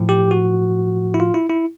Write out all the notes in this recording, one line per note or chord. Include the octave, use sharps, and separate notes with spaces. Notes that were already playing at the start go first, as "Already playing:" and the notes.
Already playing: A2 F3
G4
F#4
E4
F4
E4
E4